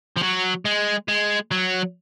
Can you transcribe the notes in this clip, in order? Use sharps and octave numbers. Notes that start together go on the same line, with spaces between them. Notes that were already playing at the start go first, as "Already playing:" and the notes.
F3
F#3
G#3
G#3
F#3